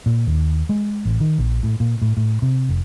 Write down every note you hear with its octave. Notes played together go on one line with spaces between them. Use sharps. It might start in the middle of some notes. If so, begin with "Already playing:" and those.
A#2
D#2
G#3
A1
D#3
A#1
A2
A#2
A2
A2
C3
F1